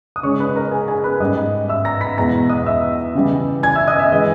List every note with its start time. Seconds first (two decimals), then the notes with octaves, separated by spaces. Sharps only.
0.16 D#6
0.23 C#3 G#3 D#4 C#5 C#6
0.39 B4 B5
0.56 A#4 A#5
0.71 G#4 G#5
0.88 G#4 G#5
1.04 B4 B5
1.20 G#2 G3 C#4 D#5 D#6
1.68 E5 E6
1.85 A#5 A#6
2.01 B5 B6
2.17 E2 B2 G#3 A#5 A#6
2.49 D#5 D#6
2.66 E5 E6
3.15 C#3 E3 G3
3.63 G#5 G#6
3.75 E5 E6
3.88 D#5 D#6
3.99 E5
4.11 E3 G#3 D#5